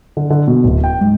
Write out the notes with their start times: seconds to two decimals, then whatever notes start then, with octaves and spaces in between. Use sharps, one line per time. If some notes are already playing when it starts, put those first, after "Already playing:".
0.17 D3
0.30 D3
0.47 B2
0.64 D1
0.84 G5
1.01 G#2